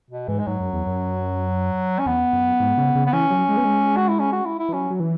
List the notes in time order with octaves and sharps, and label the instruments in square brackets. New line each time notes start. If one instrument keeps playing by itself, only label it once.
[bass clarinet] B2
[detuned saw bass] G#2 [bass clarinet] E3
[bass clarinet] G#3
[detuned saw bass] G#2 [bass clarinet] F#3
[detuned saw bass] F#2
E2
F#2
[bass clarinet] C#4
[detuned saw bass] E2 [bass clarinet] B3
[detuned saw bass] F#2
G#2
C#3
C#3
[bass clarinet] B3
[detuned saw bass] E3 [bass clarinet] C#4
[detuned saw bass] F#3
G#3
B3
G#3
[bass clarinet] F#4
E4
C#4
F#4
E4
E4
[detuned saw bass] E3
[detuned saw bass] F#3 [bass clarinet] C#4
[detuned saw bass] F#3
E3